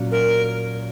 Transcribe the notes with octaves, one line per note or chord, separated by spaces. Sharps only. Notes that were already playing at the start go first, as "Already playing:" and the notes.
Already playing: A#2 F#3 C#4 F#4
A#4